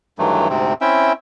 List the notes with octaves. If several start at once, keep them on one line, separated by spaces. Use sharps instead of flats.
G2 D#3 E3 F#3 A3
D2 G#2 C3 C4
C4 C#4 E4 E5 G5